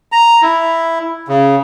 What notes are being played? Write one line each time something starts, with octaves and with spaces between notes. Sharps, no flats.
A#5
E4
C#3